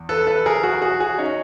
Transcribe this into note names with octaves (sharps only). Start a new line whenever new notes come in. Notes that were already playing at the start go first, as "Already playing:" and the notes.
Already playing: E2
A4 B4
A4 B4
G#4 A#4
F#4 G#4
F#4 G#4
F#4 G#4
C#4 D#4